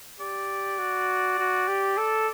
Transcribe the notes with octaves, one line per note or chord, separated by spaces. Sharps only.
G4 D5
F#4
F#4
G4
A4